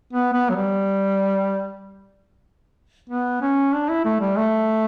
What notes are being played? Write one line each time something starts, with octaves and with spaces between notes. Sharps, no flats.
B3
B3
F#3
G3
B3
C#4
D4
E4
A3
G3
A3